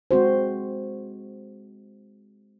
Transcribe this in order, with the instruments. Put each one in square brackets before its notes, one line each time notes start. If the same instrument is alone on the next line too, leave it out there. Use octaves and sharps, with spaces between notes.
[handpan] G#3 C4 F#4 C5